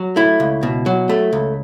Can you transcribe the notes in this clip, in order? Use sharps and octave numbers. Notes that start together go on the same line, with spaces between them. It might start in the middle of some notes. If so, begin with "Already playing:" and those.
Already playing: F#3
A3 E4
C#2
B2
F#3
A3
C#2